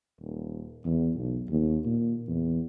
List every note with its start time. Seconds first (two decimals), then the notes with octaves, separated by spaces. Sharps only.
0.20 D#1
0.85 E2
1.15 B1
1.50 D#2
1.86 A#2
2.27 E2